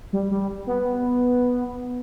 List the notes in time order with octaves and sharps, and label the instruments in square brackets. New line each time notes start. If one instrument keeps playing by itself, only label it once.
[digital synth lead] G3
G3
B3